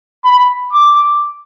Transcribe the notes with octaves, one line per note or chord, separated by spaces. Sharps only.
B5
D6